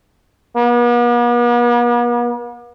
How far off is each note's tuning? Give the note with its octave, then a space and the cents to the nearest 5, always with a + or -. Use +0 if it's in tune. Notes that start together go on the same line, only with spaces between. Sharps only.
B3 -45